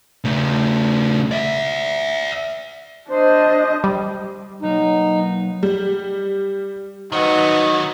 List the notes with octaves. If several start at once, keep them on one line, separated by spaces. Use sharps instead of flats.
C#3 A3
D5 E5
D4 C5 D#5
G3
B2 F#3 A#3 D#4
G3
D#3 F#3 D#4 F#4 B4